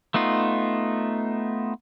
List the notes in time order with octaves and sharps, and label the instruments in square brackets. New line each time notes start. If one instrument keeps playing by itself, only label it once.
[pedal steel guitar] A3 B3 D#4 F4